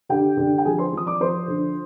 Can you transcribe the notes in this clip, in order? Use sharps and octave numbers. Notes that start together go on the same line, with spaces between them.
D3 G4 G5
D3
G5
F3 G#4 G#5
C5 C6
F3 D#6
D5 D6
F3 C5 C6
D3